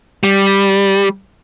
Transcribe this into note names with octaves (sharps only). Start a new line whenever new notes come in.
G3